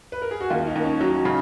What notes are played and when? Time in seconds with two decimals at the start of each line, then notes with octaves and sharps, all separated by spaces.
0.12 B4
0.22 A#4
0.31 G#4
0.40 F#4
0.50 D#2 F4
0.67 D#4
0.75 D#2
0.84 C#4
1.00 F#3 D#4
1.25 C#3 D#4